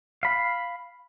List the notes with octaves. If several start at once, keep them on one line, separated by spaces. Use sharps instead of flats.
F5 B5